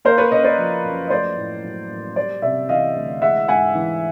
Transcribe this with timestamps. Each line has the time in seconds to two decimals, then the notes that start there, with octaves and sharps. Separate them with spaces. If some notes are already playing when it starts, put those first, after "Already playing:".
0.05 A#3 A#4 C5
0.18 B4 C#5
0.31 C#3 C#5 D#5
0.44 C5 D5
0.58 F3
0.84 F#2
1.07 D#5
1.10 A3 C5 D5
1.37 A2
1.64 F#3
1.90 A1
2.16 G3 C5 D5
2.42 C3 D5 E5
2.69 E3 D#5 F5
2.96 D2
3.22 G#3 E5 F#5
3.48 G#2 F#5 G#5
3.75 E3